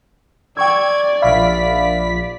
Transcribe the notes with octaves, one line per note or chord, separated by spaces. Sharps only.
D5 G5 C#6 E6 G#6
A#1 E5 F5 B5 B6